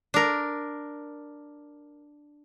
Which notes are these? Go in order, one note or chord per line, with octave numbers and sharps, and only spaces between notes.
D4 A#4